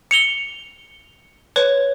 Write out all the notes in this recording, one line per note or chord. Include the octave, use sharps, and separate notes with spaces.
C#7 F7 G7
B4 C#5